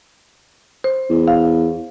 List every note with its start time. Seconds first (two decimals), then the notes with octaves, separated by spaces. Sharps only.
0.84 C5
1.10 E2
1.28 F5